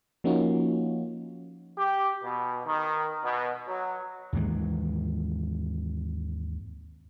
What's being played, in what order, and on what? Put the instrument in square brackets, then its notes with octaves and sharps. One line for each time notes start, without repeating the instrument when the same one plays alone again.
[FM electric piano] F3 A#3 C#4 D#4 F4 F#4
[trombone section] G4
B2
D#3
B2
F#3
[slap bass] D#2 G#2 E3 G#3